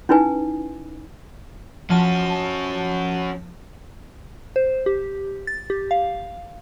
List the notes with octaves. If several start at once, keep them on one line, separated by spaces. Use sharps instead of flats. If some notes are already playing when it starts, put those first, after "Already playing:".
C#4 D#4 E4 B4 G#5
F3 C#4 F#4 A5
C5
G4
A6
G4
F5